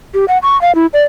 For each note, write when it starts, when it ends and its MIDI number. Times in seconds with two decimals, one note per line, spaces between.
0.14 0.25 67
0.28 0.38 78
0.43 0.60 85
0.62 0.74 77
0.75 0.86 64
0.93 1.02 74